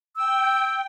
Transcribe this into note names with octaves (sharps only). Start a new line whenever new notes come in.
G5 E6